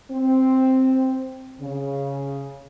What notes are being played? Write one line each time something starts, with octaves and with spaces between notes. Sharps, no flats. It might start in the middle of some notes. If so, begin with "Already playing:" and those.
C4
C#3